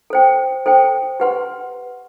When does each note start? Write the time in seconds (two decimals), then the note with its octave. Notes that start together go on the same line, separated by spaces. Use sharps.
0.10 A4 C5 G5
0.66 A4 C5 G5
1.20 G4 B4 F#5 C6